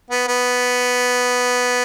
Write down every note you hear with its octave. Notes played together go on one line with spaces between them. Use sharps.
B3
B3